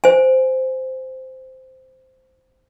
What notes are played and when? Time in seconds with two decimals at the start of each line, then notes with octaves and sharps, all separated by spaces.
0.04 C5 G#5